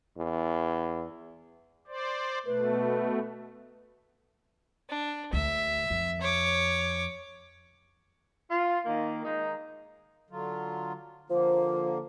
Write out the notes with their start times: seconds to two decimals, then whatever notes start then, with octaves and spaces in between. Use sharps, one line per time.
0.17 E2
1.88 C5 D5
2.46 B2 A3 B4
4.90 D4
5.33 D2 E5
5.90 F2
6.21 C#5 D6
8.51 F4
8.86 D#3 A#3
9.25 D#3 G#3 D#4
10.30 D3 F#3 F4
11.30 D3 F3 A#3 C5